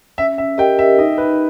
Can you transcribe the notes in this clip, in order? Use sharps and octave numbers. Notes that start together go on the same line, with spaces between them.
C#4 E5
E5
G4 A#4 D#5 G5
E5
D#4 D#5
B4